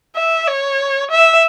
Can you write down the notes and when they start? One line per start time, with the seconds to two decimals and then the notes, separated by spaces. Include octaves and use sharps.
0.16 E5
0.47 C#5
1.11 E5